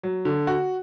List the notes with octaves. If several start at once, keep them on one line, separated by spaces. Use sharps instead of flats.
F#3
D3
F#4